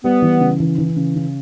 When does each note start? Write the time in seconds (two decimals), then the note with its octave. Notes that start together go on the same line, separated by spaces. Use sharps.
0.03 G3 B3
0.22 E3
0.40 C#3
0.60 E3
0.78 E3
0.96 C#3
1.16 C#3